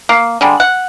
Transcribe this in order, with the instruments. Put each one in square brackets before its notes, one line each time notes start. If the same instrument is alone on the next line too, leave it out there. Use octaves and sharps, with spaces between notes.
[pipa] A#3
D3 G3 G#3
F#5